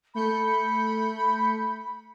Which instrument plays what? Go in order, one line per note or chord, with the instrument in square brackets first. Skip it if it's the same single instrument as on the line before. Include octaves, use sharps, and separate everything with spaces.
[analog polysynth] A3 G6 C#7 [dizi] B5